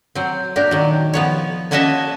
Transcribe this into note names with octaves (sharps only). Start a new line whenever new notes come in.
F#3 C4
A#2 D4 G4 A#4
D#3 F#3
F3 B3 C#5
A#3 C#4 F#4 D#5 E5 A5